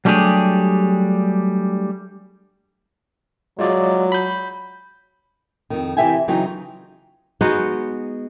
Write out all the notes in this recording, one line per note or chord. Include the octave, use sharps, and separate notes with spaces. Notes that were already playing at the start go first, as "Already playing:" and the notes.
F#3 G3 A3 D4 G4 G#4
F#3 G#3 F4 D5
B5 G6
F2 D#3
C3 E3 G4 E5 G5 G#5
C#3 E3 F#3 D#4 F4 G5
G#3 B3 D#4 F#4